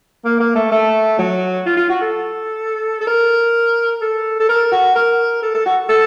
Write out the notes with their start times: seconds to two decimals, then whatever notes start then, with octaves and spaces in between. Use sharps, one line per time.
0.25 A#3
0.40 A#3
0.55 A3
0.72 A3
1.19 F#3
1.66 F4
1.77 F4
1.90 F#4
2.01 A4
3.01 A4
3.07 A#4
4.01 A4
4.40 A4
4.49 A#4
4.72 F#4
4.96 A#4
5.43 A4
5.55 A4
5.66 F#4
5.89 A4